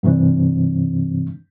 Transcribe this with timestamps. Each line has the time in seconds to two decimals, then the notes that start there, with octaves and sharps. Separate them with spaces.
0.03 G2 C3 E3 C4 D4